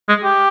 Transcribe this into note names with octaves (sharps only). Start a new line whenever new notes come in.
G#3
G4